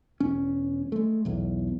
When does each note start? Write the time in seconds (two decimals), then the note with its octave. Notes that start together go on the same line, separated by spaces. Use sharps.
0.20 E1 C#4
0.92 G#3 A3
1.25 B1 E2